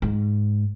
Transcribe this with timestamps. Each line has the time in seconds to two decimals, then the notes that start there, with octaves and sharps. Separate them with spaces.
0.02 G#2